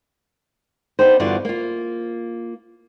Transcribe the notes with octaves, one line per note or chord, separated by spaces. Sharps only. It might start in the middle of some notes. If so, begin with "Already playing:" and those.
B3 D4 D#4 G4 G#4 C5
E2 G2 D3 F4 F#4 D5
A#3 F4